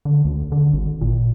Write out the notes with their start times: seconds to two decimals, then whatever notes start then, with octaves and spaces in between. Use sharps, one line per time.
0.05 D3
0.25 D2
0.52 D3
0.74 G#1
1.01 A#2